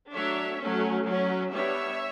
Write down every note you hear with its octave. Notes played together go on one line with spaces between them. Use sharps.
F#3 A3 D4 C#5 E5
F#3 A3 C#4
F#3 C#4
G3 B3 D4 C#5 E5